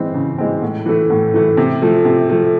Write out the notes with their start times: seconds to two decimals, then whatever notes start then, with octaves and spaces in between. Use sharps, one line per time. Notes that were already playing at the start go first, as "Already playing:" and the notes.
Already playing: E3 G#3 C4
0.14 C#3
0.38 E3 G#3 C4
0.62 A2
0.86 E3 A3
1.10 A2
1.34 E3 A3
1.57 C3
1.82 F3 A3
2.05 C3
2.30 F3 A3